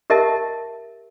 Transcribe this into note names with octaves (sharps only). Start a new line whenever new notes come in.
G4 A#4 D#5 E5 A5